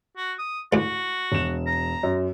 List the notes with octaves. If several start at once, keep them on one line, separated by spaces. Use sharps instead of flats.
F#4
D#6
A1 D2 F#4
E1 E7
A#5
F#2